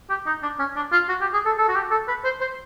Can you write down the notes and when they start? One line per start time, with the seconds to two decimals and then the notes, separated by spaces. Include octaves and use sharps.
0.10 G4
0.26 D#4
0.43 D4
0.59 C#4
0.76 D4
0.92 F4
1.09 F#4
1.21 G4
1.33 G#4
1.46 A4
1.59 A4
1.68 F#4
1.75 G4
1.91 A4
2.08 B4
2.24 C5
2.41 C5